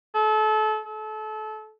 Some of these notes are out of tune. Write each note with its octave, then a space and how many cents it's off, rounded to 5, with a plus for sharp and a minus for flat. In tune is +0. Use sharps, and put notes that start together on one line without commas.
A4 -30
A4 -30